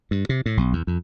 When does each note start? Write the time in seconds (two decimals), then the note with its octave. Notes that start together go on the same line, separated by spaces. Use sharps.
0.11 G2
0.29 C3
0.46 A2
0.57 B1
0.73 E2
0.87 F2